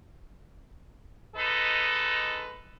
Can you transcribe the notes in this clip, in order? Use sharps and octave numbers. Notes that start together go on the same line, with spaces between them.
G#3 D#4 A4 B4